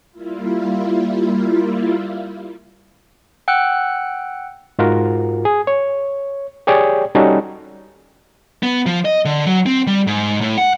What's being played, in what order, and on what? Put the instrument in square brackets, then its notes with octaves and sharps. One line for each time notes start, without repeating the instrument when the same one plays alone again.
[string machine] G3 A#3 E4 F4
[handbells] F#5 G5 E6 F#6
[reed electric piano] G#2 F4 F#4 A#4
G#4
C#5
G4 G#4 C#5 D5 G5
G3 C#4 D#4 F#4 A4
[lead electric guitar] B3
F3
D#5
D3
F#3
C4
G3
G#2
A2
F#5